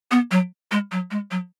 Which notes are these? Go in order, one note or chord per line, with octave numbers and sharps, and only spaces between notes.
B3
F#3
G#3
F#3
G#3
F#3